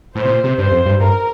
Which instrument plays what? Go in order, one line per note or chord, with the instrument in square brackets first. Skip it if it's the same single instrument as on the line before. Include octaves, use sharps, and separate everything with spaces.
[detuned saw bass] A2 [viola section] C5
[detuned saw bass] C3
A#2
C3
[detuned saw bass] G2 [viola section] C5
[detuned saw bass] F2
G2
[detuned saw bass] G2 [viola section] A#4